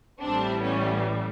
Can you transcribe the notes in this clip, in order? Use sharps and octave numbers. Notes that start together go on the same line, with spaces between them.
A1 A2 E3 G3 C4 D4
B3 C#4